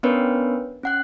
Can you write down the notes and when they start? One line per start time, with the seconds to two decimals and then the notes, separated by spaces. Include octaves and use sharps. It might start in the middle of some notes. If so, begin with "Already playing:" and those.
0.03 B3 C#4 D4 A#4 B4 C#5
0.83 C#4 F#5 F#6